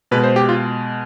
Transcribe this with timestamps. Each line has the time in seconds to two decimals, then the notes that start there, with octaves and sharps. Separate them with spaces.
0.11 B2 G#3 B4
0.23 C5
0.36 G4
0.49 F4